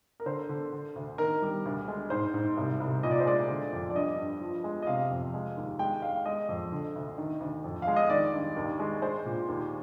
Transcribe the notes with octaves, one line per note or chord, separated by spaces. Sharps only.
A#4
D3 C5
D3
D3
D2
D#3 A#4
G3 A#4
D2
G#3
G#2 C5
G#2
C2
C2
A#2 D#5
D5
C5
G#3 D5
D3
F2
D5
G2 D#5
G2
F3
G#3
D#5
C3 F5
F2
G#3
D#2
G#3 G5
G#3 F5
G#3 D#5
F2
D3
D2
D#3
D2
F2
F5
G#3
D#5
D#3 D5
G2
D#2
G#3
G#3 C5
A#2
D#2